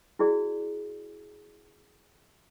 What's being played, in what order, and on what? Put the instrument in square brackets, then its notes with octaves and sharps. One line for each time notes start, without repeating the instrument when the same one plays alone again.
[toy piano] E4 F#4 G#4 D5